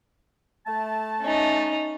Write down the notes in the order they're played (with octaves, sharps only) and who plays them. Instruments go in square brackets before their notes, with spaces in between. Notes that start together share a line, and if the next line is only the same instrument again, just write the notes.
[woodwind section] A3 A5
[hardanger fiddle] C#4 D#4